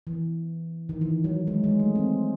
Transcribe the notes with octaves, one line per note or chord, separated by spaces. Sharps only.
E3
D#3
E3
F#3
G#3
G#3
A3
C4